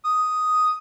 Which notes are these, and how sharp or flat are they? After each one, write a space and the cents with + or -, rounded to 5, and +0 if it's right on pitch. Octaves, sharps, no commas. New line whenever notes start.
D#6 +5